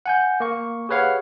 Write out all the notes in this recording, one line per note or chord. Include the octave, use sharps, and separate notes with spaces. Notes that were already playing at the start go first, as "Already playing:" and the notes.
F#5 G#5 G6
A#3 C#6
G4 G#4 B4 C#5 F5 F#5